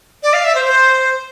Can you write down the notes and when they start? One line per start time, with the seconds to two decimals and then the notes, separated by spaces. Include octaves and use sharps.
0.23 D5
0.33 F5
0.45 E5
0.55 C5
0.65 C5